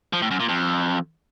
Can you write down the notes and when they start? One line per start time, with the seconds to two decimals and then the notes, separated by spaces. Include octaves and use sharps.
0.13 F3
0.22 A2
0.31 F#2
0.40 A#2
0.49 F2